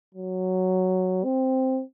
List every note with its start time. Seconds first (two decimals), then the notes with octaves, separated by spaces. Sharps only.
0.15 F#3
1.24 C4